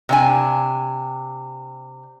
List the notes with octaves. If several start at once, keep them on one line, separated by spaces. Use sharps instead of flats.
C3 D4 G#5